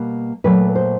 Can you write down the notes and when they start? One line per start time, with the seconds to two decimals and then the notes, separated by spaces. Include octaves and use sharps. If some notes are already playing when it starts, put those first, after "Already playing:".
Already playing: B2 G3 A#3
0.44 A#2 F#3 A3 B4
0.75 C5